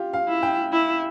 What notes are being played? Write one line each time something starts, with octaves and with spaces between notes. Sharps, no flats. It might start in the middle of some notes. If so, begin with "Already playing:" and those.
Already playing: F4 G4
F5
E4
G5
E4